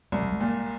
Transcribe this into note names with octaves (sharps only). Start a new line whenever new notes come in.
C2 G#3
G3
G#3
A#2